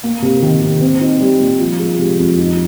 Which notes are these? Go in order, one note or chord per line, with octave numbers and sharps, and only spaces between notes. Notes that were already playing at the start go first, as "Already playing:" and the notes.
A#3
C3
D#3
C3
C4
D#4
G3
A#2
F3
G#3
C3
F2
D#4